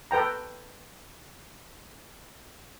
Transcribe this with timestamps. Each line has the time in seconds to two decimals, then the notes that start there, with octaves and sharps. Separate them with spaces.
0.11 A4 B4 G5 A#5